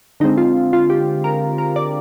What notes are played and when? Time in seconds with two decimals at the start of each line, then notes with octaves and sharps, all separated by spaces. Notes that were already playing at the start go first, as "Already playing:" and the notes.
0.20 D3 G#3 C4 D#4
0.38 F4
0.73 F4
0.90 G4
1.24 A#4
1.58 A#4
1.76 D5